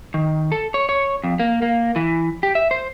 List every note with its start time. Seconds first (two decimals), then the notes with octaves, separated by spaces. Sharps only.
0.14 D#3
0.52 A4
0.74 C#5
0.89 C#5
1.24 F2
1.39 A#3
1.62 A#3
1.96 E3
2.43 G4
2.55 E5
2.71 C5